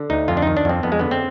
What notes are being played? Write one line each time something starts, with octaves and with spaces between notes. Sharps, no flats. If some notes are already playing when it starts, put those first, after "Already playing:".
Already playing: D3
D2 D#4
F2 F4
D4
D#3 D#4
D4
F2 C4
F2 B3
G#3
D3 B3
C4